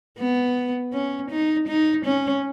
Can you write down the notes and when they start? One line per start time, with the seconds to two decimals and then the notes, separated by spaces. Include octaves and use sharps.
0.19 B3
0.93 C#4
1.31 D#4
1.68 D#4
2.06 C#4